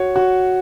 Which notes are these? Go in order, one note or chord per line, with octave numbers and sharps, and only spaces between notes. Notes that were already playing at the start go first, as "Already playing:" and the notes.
Already playing: F#4 C#5
F#4